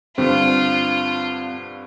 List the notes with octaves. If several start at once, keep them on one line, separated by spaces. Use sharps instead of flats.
G2 D3 C4 F4